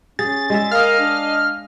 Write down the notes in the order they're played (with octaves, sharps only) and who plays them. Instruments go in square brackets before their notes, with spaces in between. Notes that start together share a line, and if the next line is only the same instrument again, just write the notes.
[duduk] C#4 [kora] G#4 [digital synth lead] A6
[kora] G#3 G#4 E5
[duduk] A#4 [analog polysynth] D#5 F5 [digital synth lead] F6
[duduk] D4